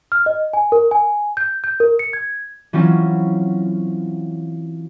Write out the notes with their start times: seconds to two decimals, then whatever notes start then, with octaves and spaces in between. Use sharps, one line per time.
0.12 F6
0.26 D#5
0.53 G#5
0.72 A#4
0.91 G#5
1.37 G6
1.64 G6
1.80 A#4
1.99 C#7
2.13 G#6
2.73 E3 F#3 C4 C#4 F4